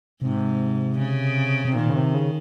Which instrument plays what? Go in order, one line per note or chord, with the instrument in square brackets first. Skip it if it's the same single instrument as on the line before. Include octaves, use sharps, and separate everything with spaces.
[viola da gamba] G#2 [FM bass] C3
[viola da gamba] C#3
[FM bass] C3
[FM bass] A#2 [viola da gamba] D#3
[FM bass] C#3
C3
C#3